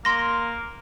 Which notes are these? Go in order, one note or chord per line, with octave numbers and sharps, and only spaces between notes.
A#3 C6 A#6